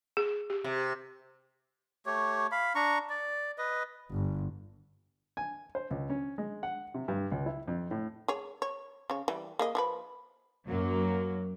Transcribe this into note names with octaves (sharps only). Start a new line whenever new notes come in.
G#4
G4
C3
A3 G4 C#5
F5 B5
D4 A#5 C#6
D5
B4 D#5
G1
G#5
C5
C#2
C#4
G#3
F#5
C3
G2
C#2
E4
F2
A2
G#4 C#5
C#5
C#3 C#5
E3 G3
A#3 G#4 D#5
F3 G#4 B4
F#2 F#3 A#3